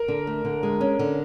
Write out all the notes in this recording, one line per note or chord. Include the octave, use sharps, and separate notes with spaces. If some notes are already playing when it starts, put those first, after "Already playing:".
Already playing: A#4
D3
A3
D3
G#3
C#4
D3